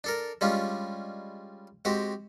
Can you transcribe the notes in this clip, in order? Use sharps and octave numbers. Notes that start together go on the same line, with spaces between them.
D4 A4 A#4
G3 G#3 C#4 D4 F4
G#3 C4 F#4 G4